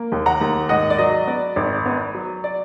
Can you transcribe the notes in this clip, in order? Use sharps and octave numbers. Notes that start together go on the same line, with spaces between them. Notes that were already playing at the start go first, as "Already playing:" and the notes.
Already playing: A#3
D#2
F#5 A#5
D#2
G#2 D#5 F#5
D5
F#3 D#5
B3 D5
G#1
B3
F#3
D5